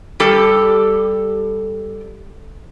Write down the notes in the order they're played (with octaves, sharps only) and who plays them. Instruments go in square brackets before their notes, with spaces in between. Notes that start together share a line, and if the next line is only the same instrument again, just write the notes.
[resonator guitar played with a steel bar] G3 G4 A4